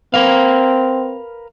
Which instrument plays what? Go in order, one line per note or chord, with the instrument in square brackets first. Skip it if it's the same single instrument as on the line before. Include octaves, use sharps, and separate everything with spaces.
[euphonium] C4 [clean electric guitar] A#4 B4 F5